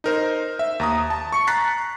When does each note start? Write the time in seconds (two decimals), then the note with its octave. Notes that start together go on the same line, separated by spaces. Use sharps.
0.04 D#4 A#4 C5
0.59 E5
0.80 D#2 A#5 D#6
1.10 A5
1.32 C#6 C#7
1.47 A#5 F#6 A6 B6 C7